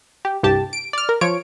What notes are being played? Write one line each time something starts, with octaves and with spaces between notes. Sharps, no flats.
G4
C2 G2 G4 A5
D7
D5 F6
A#4
F3 C#5 D7